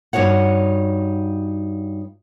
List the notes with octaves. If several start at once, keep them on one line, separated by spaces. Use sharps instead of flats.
G2 D#4 F#4 C#5 F#5